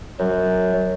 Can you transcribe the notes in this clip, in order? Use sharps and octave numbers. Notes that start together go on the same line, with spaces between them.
F#2 F#3